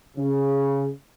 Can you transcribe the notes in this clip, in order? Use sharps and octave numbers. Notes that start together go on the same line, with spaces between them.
C#3